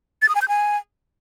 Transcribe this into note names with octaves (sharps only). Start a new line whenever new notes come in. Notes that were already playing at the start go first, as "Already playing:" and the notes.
A6
D#6
G#5
G6
G#5